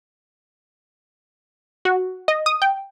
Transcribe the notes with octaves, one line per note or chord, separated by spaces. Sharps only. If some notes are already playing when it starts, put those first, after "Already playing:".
F#4
D#5
D#6
G5